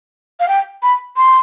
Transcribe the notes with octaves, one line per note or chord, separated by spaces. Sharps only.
F5
G5
B5
C6